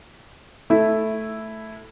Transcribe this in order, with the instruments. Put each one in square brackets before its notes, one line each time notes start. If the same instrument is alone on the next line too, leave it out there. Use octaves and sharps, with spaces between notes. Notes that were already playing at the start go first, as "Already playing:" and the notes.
[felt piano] A3 E4